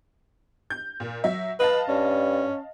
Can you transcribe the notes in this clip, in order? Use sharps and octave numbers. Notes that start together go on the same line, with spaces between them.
G6
A#2
F#3 E5
B4 D#5 F5 A5
G2 C#4